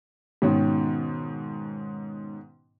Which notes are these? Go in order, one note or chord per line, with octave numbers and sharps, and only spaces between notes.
G#2 B2 D#3 C#4